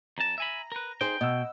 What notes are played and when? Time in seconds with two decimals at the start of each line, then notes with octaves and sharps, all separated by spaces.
0.18 F2 A5 A#5 A#6
0.38 E5 G#5 B5
0.72 A#4 B4
1.01 D#4 G#4 C5 G5
1.21 B2 D#5 F#5 E6